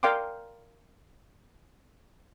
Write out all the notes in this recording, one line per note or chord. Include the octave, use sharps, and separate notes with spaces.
A#4 D5 F5 G5 C6 D6